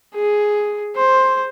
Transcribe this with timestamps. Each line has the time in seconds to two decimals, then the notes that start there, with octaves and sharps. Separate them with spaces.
0.15 G#4
0.96 C5